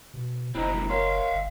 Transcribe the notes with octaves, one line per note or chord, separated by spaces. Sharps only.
B2
F#1 C4 D#4 E4 A#5
G2 B2
A#4 C#5 E5 F5 C6
G1